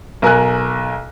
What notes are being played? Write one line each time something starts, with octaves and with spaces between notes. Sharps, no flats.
B1 A#4 G#5 F#6